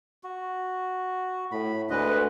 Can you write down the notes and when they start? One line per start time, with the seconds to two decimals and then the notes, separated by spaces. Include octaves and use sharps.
0.24 F#4
1.52 A2 B5
1.90 D2 D3 G#3 B4 D#5